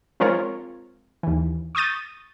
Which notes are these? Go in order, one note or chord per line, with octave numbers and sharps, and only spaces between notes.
F3 G#3 C4 F4 A#4 C#5
D#2 E3
C#6 D#6 G6 A6 D#7